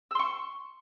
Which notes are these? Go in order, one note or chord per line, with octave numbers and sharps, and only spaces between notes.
C6 C#6 E6